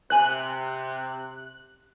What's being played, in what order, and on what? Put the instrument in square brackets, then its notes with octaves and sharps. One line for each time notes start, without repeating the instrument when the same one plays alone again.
[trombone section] C3 [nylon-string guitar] C5 G#5 [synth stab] F#6